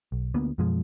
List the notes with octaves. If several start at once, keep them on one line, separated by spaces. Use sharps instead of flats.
B1
D2 A#3 B3
F#2 B2 F3 G#3